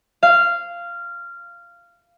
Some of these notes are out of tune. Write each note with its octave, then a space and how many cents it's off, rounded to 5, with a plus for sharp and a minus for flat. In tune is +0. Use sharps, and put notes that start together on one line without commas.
F5 -15